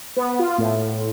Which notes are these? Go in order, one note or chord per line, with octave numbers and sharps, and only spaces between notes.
B3
F4
A2